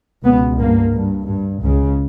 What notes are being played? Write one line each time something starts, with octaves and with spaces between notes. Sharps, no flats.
C#2 B2 B3
G2 A#3
G2
G2
C#2 C#3